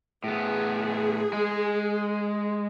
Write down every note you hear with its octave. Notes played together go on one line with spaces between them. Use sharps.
A2 B3 G#4
G#3